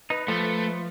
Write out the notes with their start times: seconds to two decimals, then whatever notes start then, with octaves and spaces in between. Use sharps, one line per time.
0.10 D#4 B4
0.28 F3 A3